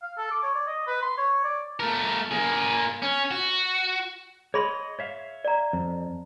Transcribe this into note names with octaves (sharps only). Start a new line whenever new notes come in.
F5
A4
D6
C#5
D5
D#5
B4
C6
C#5
D5
A3 A#4
A#3 G#4
C#4
F#4
G#4 C#5 D#5 B5 C6
C#5 E5 F5
D5 A#5
F2